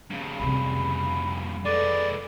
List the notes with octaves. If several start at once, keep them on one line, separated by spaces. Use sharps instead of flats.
G2 C#3
F2 C3 B5
G#3 A4 B4 D5